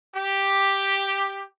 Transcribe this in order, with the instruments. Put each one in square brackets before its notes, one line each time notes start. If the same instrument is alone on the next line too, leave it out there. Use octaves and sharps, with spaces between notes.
[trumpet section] G4